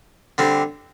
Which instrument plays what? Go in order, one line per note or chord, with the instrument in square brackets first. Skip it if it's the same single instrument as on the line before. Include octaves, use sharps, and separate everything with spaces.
[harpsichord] D3 G3 C4